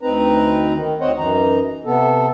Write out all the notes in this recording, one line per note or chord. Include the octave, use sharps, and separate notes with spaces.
D2 C4 D#4 B4 A#5
D#3
D2 C4 C5 C#5 D#5 F#5
F#2 E3 D#4 A#5
C3 B3 A4